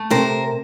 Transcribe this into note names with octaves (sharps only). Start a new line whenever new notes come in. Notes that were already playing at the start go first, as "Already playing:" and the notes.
Already playing: A3
C3 A#4 C5